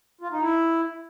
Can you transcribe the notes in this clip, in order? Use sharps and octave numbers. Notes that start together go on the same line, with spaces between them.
F4
D#4
E4